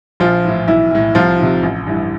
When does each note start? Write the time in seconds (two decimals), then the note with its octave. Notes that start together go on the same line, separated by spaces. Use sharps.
0.20 A#1 F3 F4
0.45 A2 E3
0.67 B1 E3 E4
0.91 A2 E3
1.15 C2 F3 F4
1.38 C3 D#3
1.63 A1
1.87 G2 E3